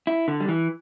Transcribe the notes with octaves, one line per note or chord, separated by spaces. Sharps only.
E4
D3
G3
E3